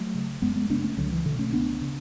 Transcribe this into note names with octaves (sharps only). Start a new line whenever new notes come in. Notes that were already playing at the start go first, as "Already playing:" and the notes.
Already playing: F#3 A3
C#3
F#2 G#3 B3
G#3 B3
C#3 B3 D4
A3 C#4
C#2 D3 F#3
E3
B2 D3
A3 C#4
C#2 B3 D4
C#3